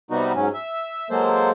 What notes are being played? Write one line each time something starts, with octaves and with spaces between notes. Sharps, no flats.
C3 G3 B3 D#4 F#4
G#2 F#3 C#4
E5
F#3 G#3 A#3 A4 C5